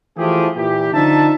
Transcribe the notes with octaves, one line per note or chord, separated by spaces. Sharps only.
E3 F3 A3 E4 G4 G#4
A#2 E3 G4
D3 F3 D4 D#4 E5 A5